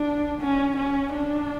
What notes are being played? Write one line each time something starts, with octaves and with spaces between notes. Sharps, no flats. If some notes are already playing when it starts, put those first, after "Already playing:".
Already playing: D4
C#4
C#4
D4